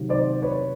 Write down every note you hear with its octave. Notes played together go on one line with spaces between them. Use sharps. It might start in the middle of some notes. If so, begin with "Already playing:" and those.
Already playing: C3 D#3 F#3
C5 D5
B4 C#5